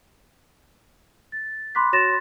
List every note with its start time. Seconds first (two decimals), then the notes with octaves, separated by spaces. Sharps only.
1.32 A6
1.75 B5 C6 D6 F#6 B6
1.93 F#4 C#5 C6 A6 A#6 E7